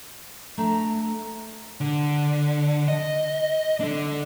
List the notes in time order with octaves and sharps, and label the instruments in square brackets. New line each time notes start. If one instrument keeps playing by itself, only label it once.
[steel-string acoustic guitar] A3 D4 E5 [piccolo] A#5
[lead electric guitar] D3
D#5
D4 A4